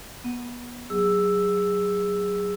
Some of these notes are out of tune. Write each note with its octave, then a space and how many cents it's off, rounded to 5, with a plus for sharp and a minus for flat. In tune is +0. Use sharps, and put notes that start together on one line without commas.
B3 -30 F#5 +0
F#3 +15 G#4 -20 E6 +0